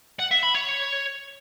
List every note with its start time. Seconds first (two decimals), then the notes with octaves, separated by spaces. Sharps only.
0.19 F#5
0.31 E5
0.43 B5
0.55 C#5